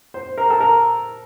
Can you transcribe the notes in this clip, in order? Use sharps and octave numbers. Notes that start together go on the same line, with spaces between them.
C5
A#4
A4
A#4